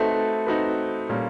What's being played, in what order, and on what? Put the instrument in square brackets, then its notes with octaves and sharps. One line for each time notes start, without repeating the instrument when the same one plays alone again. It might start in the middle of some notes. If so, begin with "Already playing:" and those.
Already playing: [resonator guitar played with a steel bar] A3 [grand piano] C4 D#4 F#4 B4
[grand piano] C4 D#4 F#4 B4
A#2 G3 A#3 C#4